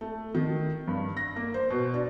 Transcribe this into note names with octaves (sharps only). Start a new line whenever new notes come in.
A3
D#3
G2
A#6
A#3
C5
B2
D4